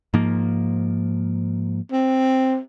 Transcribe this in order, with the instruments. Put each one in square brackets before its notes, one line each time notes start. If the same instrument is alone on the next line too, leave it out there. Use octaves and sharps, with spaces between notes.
[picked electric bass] G#2 F3 A#3
[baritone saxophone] C4